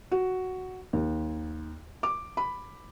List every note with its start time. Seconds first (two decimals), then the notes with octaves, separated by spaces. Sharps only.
0.12 F#4
0.93 D#2
2.03 D6
2.37 B5